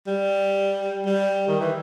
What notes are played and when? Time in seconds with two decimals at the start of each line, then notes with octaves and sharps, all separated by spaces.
0.07 G3
1.06 G3
1.48 D#3
1.60 E3